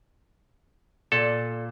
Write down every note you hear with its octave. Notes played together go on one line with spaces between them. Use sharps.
A#2 A4